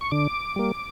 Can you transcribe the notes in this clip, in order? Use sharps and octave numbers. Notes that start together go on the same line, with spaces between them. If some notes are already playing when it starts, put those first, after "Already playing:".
C#6
D3 D6
G3 A#3